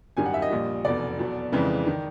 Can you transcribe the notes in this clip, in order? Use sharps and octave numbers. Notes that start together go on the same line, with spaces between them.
G#1 F#2 D#3 G3 G#5
F#5
E5
D#5
A#1 A#2 G3
F1 E2 B2 D5
E2 B2 F#3
F2 C#3 E3 G#3
D#3